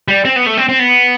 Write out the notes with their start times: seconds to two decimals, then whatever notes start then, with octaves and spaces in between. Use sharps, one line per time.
0.08 G3
0.25 C4
0.36 B3
0.46 A3
0.57 C4
0.69 C4
0.80 B3